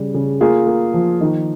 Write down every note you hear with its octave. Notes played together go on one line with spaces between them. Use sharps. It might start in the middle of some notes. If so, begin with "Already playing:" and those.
Already playing: C#3 G3
C#3
A#3 F4 G#4
A#3
F3
D#3